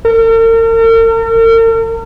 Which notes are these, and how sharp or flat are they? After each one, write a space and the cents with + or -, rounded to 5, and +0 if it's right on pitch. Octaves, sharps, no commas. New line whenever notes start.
A#4 -45